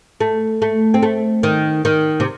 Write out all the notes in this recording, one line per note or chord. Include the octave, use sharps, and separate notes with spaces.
A3
A3
C4
A3
D#3
D#3
C3